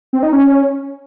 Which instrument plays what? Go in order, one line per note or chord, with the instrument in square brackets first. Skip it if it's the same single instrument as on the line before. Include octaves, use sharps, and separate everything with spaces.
[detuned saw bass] C4
D#4
C#4